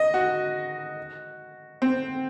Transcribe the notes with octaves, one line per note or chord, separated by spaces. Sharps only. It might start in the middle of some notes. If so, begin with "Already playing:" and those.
Already playing: D#5
F#4
C4